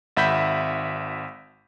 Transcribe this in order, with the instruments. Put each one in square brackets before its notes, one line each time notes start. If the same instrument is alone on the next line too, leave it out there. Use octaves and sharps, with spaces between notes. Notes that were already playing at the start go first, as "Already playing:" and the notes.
[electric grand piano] G#1 E5 F#5 B5 G6 B6